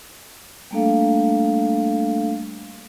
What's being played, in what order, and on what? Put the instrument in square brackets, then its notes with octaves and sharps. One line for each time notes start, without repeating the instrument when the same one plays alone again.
[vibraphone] G3 A3 A#3 D4 A4 F5